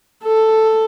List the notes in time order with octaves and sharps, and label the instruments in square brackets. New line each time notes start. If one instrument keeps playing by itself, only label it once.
[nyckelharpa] A4